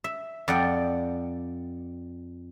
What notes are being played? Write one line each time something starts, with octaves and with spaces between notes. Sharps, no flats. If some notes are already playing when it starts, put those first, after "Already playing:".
E5
F2 D5 F#5 G5